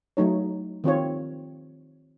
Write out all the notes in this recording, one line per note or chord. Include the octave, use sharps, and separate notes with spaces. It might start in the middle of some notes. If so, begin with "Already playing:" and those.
F#3 A3 D#4 C#5
D#3 C4 F4 C#5